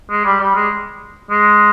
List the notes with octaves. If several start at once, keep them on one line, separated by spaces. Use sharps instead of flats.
G#3
G3
G3
G#3
G#3